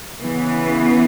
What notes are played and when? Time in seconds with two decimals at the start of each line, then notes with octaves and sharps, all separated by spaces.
0.19 C#3 E3 B3